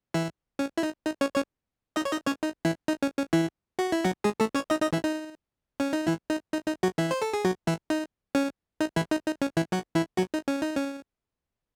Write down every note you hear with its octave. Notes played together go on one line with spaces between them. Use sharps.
E3 E4
C#4
E4
D#4
D#4
C#4 C#5
C#4 C#5
D#4 D#5
C#5
D#4 D#5
C#4 C#5
D#4
E3 E4
D#4
C#4
C#4
E3 E4
F#4
E4
F#3 F#4
G#3 G#4
A3 A4
C#4 C#5
D#4 D#5
D#4 D#5
E3 E4
D#4
C#4
D#4
E3 E4
D#4
D#4
D#4
F#3 F#4
E3 E4
C5
A4
G#4
F#3 F#4
E3 E4
D#4
C#4
D#4
E3 E4
D#4
D#4
C#4
E3 E4
F#3 F#4
E3 E4
F#3 F#4
D#4
C#4
D#4
C#4